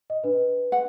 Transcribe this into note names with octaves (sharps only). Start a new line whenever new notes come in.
D#5
D4 B4
F#5